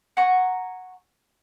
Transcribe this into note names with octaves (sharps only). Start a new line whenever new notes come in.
F#5 G#5 A#5 C#6